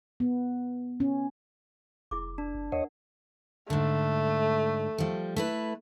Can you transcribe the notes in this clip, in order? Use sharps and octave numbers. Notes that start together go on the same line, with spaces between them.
B3
C#4
F1 E4 G#4 D6
D4
F#1
D#2 A#4 C#5 D#5 F#5
G#2 D3 A3
F3 G3
A3 E4 B4